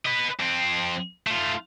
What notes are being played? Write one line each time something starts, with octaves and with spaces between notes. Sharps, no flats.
B4 D#5
F2 C4
A3 F4